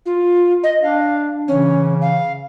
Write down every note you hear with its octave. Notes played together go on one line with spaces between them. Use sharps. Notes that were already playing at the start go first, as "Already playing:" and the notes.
F4
D#5
D4 F5
C#3 E3 C#4
F5